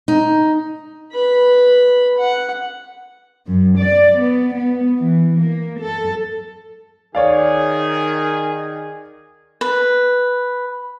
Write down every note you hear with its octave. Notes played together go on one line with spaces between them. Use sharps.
D#4
B4 B5
F#5
F#2
D5
B3
B3
E3
A#3
A4
D#3 G#4 C#5 D5 F5
B4